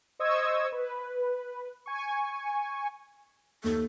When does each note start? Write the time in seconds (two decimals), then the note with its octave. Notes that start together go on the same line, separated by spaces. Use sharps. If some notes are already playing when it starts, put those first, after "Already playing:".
0.19 C5 D#5 C#6 D#6 E6 G#6
0.72 B4
1.86 G#5 C#6
3.64 D#2 A4